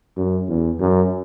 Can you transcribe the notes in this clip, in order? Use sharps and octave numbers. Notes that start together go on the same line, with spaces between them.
F#2
E2
F#2